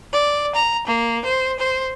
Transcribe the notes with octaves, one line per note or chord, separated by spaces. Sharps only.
D5
A#5
A#3
C5
C5